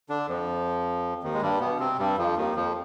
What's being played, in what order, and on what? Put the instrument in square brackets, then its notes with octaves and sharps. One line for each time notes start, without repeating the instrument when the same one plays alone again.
[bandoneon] D3 D4
F2 F3
D#2 D#3
G#3
G2 G3
B2 B3
C3 C4
G2 G3
F2 F3
D#2 D#3
F2 F3